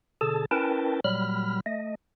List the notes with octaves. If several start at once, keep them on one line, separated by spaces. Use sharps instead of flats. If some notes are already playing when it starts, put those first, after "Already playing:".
B2 D3 G#4 A4 A5
C#4 E4 A#4 B4 G5 A5
A#2 F#3 G3 B5 F6
A3 D#5